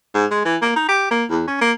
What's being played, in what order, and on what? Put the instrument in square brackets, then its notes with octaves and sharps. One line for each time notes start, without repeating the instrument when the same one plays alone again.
[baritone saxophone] G#2
G#3
E3
A#3
D#4
G4
A#3
E2
C#4
A#3